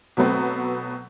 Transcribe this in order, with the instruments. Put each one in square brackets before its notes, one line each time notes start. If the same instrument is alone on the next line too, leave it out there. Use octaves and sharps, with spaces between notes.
[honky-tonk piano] B2 F#3 A3 B3 C4